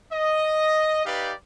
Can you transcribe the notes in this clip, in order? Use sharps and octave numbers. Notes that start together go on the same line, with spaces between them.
D#5
D#4 G4 B4 D5 F5